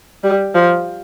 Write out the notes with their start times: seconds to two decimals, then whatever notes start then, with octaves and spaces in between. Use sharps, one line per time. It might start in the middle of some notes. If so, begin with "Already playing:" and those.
0.23 G3
0.55 F3